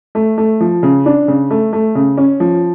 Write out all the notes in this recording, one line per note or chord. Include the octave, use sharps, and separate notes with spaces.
A3
A3
F3
C#3
D4
C#3
A3
A3
C#3
C#4
F3